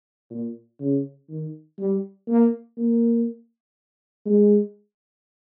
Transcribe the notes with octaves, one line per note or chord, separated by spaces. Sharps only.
A#2
C#3
D#3
G3
A#3
A#3
G#3